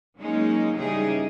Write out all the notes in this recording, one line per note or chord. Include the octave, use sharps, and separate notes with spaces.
F#3 G#3 A#3 C#4 D#4
G2 C#3 E3 D#4 G4 G#4